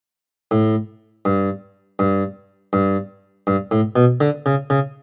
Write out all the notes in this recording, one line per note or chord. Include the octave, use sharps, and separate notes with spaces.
A2
G2
G2
G2
G2
A2
B2
D3
C#3
C#3